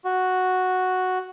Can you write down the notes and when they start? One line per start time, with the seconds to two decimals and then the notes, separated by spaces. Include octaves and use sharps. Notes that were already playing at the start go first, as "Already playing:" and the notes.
0.04 F#4